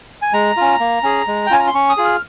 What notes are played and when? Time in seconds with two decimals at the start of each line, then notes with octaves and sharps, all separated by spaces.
0.22 G#5
0.33 G#3 A#5
0.57 C#4 F4
0.80 A#3
1.03 C#4 G#4
1.28 G#3
1.46 G5
1.50 C#4 F4 G#5
1.60 A#5
1.67 C6
1.74 C#4 C#6
1.90 D#6
1.97 F4 G#4
2.05 F6